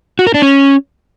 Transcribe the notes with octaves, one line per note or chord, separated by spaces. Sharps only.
F#4
A#4
D4
C#4